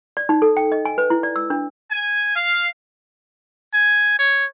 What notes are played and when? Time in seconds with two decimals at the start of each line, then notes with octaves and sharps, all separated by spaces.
0.17 D5
0.29 D#4
0.42 A4
0.57 G5
0.72 D#5
0.85 G#5
0.98 B4
1.10 E4
1.23 D5
1.36 E6
1.50 D4
1.92 G#5
2.36 F5
3.74 G#5
4.19 C#5